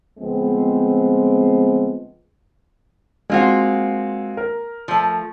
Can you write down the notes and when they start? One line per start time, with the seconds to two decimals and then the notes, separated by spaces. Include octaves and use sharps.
0.19 D2 F3 G#3 B3 C4
3.30 G#3 A#3 C4 F4 F#4
4.37 A#4
4.88 F3 A3